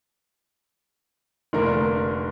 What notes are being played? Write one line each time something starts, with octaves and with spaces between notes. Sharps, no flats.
F1 D3 A#3 A#4